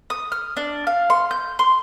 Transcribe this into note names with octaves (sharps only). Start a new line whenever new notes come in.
D#6
F6
D4
F5
C6
G6
C6